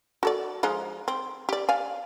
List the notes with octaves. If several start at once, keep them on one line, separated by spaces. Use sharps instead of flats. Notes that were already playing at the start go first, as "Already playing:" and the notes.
F#4 A4 D5
F3 G#3 D#4
C4
G4 D5
D5 F5 G#5